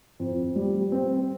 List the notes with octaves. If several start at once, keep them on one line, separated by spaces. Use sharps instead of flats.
F2
G3
C4